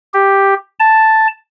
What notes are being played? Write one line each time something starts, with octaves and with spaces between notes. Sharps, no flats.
G4
A5